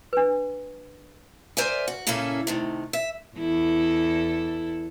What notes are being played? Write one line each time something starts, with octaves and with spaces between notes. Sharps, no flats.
D4 B4
A#4 C5 D5 E5 G#5
F#4
A#2 C#3 A#3 C#4 E4 A4
C3 D#3 A3
E5
E2 E4 A4